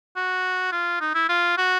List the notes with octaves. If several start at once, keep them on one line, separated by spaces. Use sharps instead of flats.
F#4
F4
D#4
E4
F4
F#4